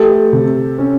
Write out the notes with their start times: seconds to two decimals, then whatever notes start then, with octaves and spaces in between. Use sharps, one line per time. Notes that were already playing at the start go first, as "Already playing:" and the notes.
Already playing: A3 G4 A4
0.33 C3
0.78 C#4